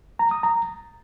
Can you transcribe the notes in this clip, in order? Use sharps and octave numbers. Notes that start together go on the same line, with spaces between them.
A#5
D#6
A#5